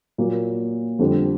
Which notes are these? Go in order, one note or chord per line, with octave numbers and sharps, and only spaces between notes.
A#2 F#3 A#3
F2 D3 G3